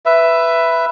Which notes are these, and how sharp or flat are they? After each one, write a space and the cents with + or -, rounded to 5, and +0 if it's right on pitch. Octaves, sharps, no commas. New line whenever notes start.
B4 +0 E5 +10